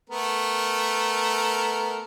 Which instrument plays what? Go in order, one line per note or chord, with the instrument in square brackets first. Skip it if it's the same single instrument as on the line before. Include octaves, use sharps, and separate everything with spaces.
[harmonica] A3 B3 A#4